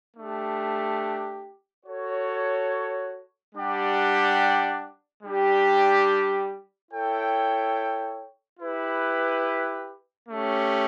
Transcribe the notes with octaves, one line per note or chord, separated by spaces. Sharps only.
A3 D4 G4
F#4 A4 C#5
G3 D4 G4 D5 F#5
G3 D4 G4
E4 A4 C#5 G5
E4 G4 B4
A3 C#4 G4